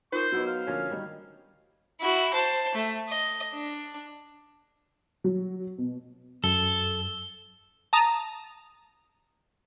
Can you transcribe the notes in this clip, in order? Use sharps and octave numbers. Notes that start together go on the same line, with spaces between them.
D#4 F4 A#4 C5 C#6
F#3 B3 D#4 E4 F#4
F5
D3 F3 A#3 C#4
D#3 G3 D#4
E4 F#4
C5 A5
A3
D#5
D4
F#3
B2
F#2 A4 G7
A5 A#5 D#6